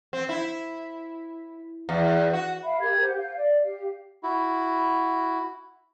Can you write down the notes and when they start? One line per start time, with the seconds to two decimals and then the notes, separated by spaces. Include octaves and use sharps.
0.13 C4
0.29 E4
1.89 E2
2.33 F#4
2.62 E5 F5 B5
2.80 G4 A#4 G#6
3.00 G4 C5 F#5 G6
3.17 F5
3.37 D5
3.63 G4 F5
4.23 E4 F#4